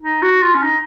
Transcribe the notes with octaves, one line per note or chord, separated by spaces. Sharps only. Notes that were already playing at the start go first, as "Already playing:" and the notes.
D#4
F#4
F4
C#4
D#4